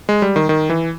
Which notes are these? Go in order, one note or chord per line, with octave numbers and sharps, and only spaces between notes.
G#3
G3
D#3
D#3
E3